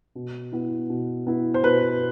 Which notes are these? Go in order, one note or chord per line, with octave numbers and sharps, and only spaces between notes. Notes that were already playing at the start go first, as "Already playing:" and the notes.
B2
B3 E4
B2
B3 E4
C5
B2 B4